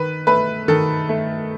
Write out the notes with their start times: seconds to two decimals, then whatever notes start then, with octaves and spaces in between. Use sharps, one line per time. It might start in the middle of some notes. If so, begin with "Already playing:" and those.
Already playing: D#3 B4
0.27 A3 B4
0.68 D#3 A4
1.09 A3